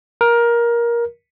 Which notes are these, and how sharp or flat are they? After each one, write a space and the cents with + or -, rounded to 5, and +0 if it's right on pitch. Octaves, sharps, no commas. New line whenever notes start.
A#4 +15